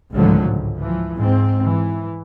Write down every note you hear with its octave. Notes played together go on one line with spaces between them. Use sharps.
G#1 C#2 A2 D3 F3 F#3
C#2
E3 F3
G#2 C4
E3